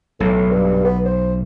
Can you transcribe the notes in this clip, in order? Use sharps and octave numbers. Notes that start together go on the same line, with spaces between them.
B1 A2
G2
B3
C5